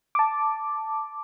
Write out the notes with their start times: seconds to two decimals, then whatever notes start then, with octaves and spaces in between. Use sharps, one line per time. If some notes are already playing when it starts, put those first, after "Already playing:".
0.15 A5 D6